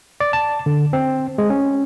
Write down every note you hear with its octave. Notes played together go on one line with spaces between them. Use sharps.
D5
A5
D3
C4
G#3
C#4